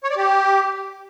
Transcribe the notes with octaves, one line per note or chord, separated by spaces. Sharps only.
C#5
D5
G4